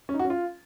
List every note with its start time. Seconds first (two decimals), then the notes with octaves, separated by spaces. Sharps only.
0.09 C#4
0.14 D#4
0.19 F#4
0.25 C#4
0.30 F4